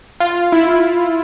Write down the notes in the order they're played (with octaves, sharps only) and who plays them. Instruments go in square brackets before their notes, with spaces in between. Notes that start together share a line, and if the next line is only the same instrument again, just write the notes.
[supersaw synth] F4
E4